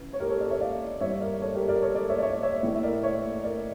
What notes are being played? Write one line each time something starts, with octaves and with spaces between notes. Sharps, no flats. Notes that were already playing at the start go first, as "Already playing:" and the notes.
Already playing: C#3 E3 E4
C#5
G4 A#4
A4 C#5
A#4 D5
C#5 E5
D5 F5
G2 E3 A#3 E4 C#5 E5
A#4 D5
A4 C#5
G4 A#4
A#4 D5
A4 C#5
A#4 D5
C#5 E5
D5
C#5 E5
C#5 E5
A2 E3 A3 D4
E5
A#4 D5
C#5 E5
A#4 D5